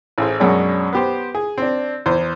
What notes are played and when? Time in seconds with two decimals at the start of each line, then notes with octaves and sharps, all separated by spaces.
0.18 A1 G#4 C5
0.40 F#2 B2 G#3 C#4 D4
0.93 B3 G4 C5
1.35 G#4
1.58 C4 D4
2.06 E2 C5